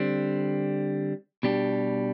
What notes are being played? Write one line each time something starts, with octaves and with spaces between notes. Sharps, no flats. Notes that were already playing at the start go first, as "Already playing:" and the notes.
Already playing: D3 G3 C4
B2 G3 D4 G4